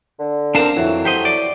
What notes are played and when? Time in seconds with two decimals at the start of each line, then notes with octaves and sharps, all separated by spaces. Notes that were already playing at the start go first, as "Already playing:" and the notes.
0.19 D3
0.55 C4 D4 A#4 F5 A5 A#5
0.77 F2 E3 F#3 A3
1.05 G4 C5 D#5
1.25 D5